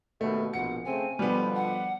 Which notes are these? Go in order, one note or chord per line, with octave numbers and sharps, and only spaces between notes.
D#2 B2 D#3 A3
A#1 B2 F#5 C#7
C#3 A3 C4 G#5
B2 D3 F3 G3 B3
F#5